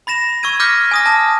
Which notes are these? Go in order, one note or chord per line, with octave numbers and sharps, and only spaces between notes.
B5 A6 A#6 E7
C#6 E6 G#6 D#7
D6 F6 G6 A#6 B6 C#7
G#5 D#6 A#6
A5 D#6